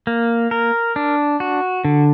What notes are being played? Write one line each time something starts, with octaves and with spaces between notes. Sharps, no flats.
A#3
A#4
D4
F#4
D3